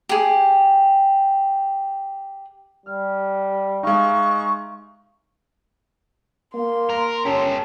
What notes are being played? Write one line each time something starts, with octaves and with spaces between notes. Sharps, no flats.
G4 G#4
G3 F6
G#3 D#4 G4 E5 F5 C#6
A#3 C6
A#4
C#4 G4 A4